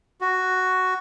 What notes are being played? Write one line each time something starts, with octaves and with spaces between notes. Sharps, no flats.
F#4